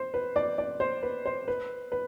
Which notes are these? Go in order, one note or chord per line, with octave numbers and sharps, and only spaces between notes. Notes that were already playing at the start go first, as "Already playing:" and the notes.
Already playing: C5
B4
D5
D5
C5
B4
C5
B4
B4